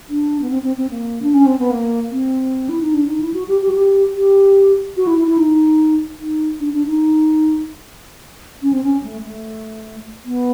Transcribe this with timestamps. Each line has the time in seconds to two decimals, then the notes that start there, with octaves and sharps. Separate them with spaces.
0.09 D4
0.42 B3
0.50 C4
0.63 C4
0.77 C4
0.90 A#3
1.22 D4
1.34 C#4
1.46 C4
1.59 B3
1.71 A#3
2.12 C4
2.69 E4
2.81 D#4
2.94 D4
3.08 D#4
3.20 E4
3.34 F#4
3.48 G4
3.61 G4
3.69 F#4
3.74 G4
4.15 G4
4.97 F#4
5.07 E4
5.18 E4
5.28 E4
5.38 D#4
6.19 D#4
6.60 D4
6.73 D4
6.86 D#4
8.62 C#4
8.73 C4
8.84 C#4
9.03 A3
9.24 A3
10.25 B3